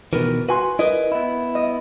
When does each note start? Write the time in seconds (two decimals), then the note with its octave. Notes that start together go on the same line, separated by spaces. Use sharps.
0.13 B2 D#3 E3 A#4 B4
0.49 F#4 B4 G#5 C6
0.79 E4 A#4 B4 D#5
1.12 B3 E4
1.55 D#5